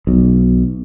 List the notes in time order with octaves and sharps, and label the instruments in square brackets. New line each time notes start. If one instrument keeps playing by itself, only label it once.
[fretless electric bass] B1